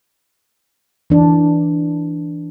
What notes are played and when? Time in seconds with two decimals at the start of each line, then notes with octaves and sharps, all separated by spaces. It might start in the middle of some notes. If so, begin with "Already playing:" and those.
1.10 E3 D4